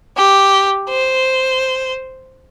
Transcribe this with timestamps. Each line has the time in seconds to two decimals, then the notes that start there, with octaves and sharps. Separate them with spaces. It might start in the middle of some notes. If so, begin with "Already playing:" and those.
0.17 G4
0.89 C5